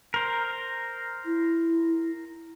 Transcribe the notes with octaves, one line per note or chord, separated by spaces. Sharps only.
A#4 C5
E4